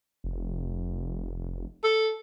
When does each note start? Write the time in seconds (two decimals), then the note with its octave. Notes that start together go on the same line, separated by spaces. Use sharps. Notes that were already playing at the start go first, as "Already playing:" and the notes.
0.24 F1
1.84 A4